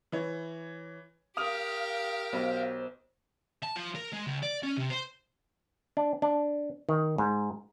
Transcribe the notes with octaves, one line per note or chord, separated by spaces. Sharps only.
E3 C#5
G4 A#4 F5 D#6 F6 F7
B1 C5
A5
F3
A#4
G#3
C#2
D5
C#4
C3
C5
D4
D4
D#3
G#2